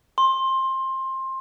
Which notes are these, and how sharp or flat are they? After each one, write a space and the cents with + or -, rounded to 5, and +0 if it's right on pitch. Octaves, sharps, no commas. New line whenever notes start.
C6 +20